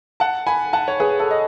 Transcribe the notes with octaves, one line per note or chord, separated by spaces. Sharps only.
F#5 A5
G#5 B5
F#5 A5
C#5
G#4 B4
A4
D#5